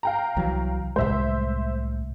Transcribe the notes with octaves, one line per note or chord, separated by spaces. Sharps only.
F5 G5 A#5
C2 E3 F#3
C2 A2 G#3 C5 E5